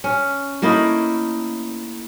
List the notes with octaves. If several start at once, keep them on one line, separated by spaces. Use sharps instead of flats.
C#4
A3 A#3 D#4 E4